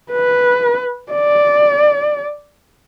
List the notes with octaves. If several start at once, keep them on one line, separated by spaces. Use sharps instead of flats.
B4
D5